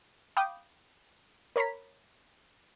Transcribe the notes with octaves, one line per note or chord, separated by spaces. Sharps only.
F5 G5 B5 D6 D#6 G6
A#4 C#5 A#5 B5 B6